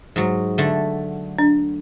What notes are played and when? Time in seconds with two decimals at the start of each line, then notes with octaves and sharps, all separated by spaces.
0.16 G#2 F#3
0.58 D3 A3
1.39 D4